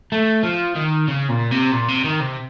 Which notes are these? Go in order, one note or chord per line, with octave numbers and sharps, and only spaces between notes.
A3
F3
D#3
C#3
A#2
C3
A#2
C3
D#3
C3